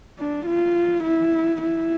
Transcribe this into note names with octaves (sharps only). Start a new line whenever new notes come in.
D4
F4
E4
E4